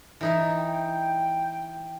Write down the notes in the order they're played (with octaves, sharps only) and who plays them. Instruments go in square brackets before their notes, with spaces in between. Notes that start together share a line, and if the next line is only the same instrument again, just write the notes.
[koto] E3 D#4 E4
[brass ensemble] G5